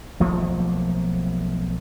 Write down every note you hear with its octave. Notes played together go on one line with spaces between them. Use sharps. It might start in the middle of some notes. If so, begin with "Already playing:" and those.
B1 F3 A3 A#3